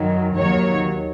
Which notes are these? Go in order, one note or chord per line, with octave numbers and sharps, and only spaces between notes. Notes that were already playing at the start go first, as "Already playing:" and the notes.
Already playing: F#2 D#3 F#3
D#2 D#3 F#3 C#5